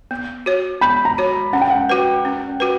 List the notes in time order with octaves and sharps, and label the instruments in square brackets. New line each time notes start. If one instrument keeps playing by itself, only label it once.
[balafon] B3
F#4 C#5
[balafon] B3 [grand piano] B5
[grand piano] A#5
[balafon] F#4 C#5
[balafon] C#4 [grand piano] F#5
[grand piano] G5
F#5
[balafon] F#4 B4
C#4
F#4 B4